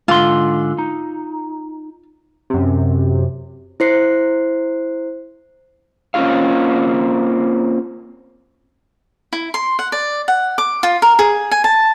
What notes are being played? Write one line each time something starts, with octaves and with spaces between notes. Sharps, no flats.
G#2 D3 F4 C6
D#4
F#2 C3
E4 C5 C7
A#3 C4 C#4 F4 G4 F5
E4
C6
F#5
D5
F#5
D6
F4
A#4
G#4
G#5
A5